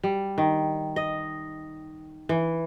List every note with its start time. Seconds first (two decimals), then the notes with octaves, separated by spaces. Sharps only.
0.03 G3
0.38 D#3
0.96 D#5
2.29 E3